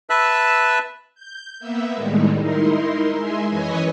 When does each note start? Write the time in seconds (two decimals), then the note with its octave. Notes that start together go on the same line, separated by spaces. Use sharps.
0.10 B4 E5 A5 E6 F#6
1.15 G6
1.60 A#3 B3 E5
1.93 A2 D#3 G3 G#3
2.40 D#4 E4 A#4 C6
3.17 G#3 E5 G#5 C6
3.48 F#2 E3 B4 C#5 D#5 G#5